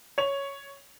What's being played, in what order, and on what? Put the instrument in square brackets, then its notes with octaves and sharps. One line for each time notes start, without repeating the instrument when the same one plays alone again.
[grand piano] C#5 F7